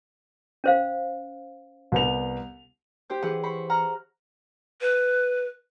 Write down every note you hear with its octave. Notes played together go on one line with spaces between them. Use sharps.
C#4 C5 F5
C2 B3 F7
G4 C5 G6
E3 G#4 F#5
C5 B5 C#6
F#5 A#5 F6
B4